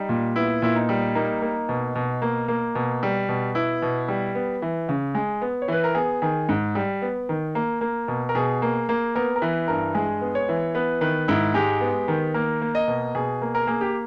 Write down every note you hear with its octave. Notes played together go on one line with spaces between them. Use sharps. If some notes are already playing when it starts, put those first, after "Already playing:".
Already playing: G3 D#4
A#2
B3 E4
A#2 E4
D#4
G3
A#3 D#4
A#3
B2
B2
A#3
A#3
B2
G3
B2
B3 E4
B2
G3
B3
E3
C#3
G#3
B3
C#5
E3 B4
A#4
B3 G#4
D#3 G#4
G#2
G3
B3
D#3
A#3
A#3
B2
A#4
B2 G#4
A#3
A#3
B3 A#4
A#4
E3 B4
G2 A#4
G#3 G#4
B3
C#5
E3
B3 B4
D#3 B4
G#2 E4
G#3 G4
B3
D#3
A#3 A#4
A#3
D#5
B2
B2 G#4
A#3
A#4
A#3 G#4
G4